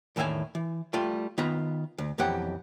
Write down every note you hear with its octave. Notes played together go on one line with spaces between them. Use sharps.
E2 A2 D#3 E5 F5 G#5
E3
G3 A3 F4
D#3 B3 F4 B4 A#5
D2
B1 F2 E3 G4 F#5